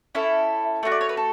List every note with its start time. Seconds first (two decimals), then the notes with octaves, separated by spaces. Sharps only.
0.15 C#4 E4 A4 E5
0.83 A3 D4 F#4
0.92 D5
1.01 C#5
1.09 B4
1.17 A4